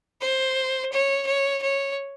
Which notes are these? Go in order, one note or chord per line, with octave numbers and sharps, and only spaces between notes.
C5
C#5
C#5
C#5